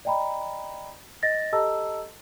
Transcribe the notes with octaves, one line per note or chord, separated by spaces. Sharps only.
D5 D#5 G5 A#5 B5
D#5 A6 A#6
G4 A4 D#5 A5 A#5 E6